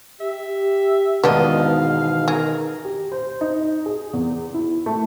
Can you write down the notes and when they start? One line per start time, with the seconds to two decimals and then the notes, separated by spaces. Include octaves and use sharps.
0.20 G4 E5
1.24 E2 G#2 B2 D#3 B3 D4 D#5 F5
2.28 G#4 A#4
2.85 G4
3.12 C5
3.41 D#4
3.86 G#4
4.13 E2
4.54 E4
4.86 A3